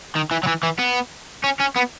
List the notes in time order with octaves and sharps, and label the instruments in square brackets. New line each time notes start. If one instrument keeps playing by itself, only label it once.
[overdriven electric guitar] D#3
E3
F#3
E3
E3
B3
C#4
C#4
B3